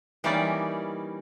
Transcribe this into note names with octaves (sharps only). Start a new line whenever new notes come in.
E3 G3 A#3 C#4 D#4 D5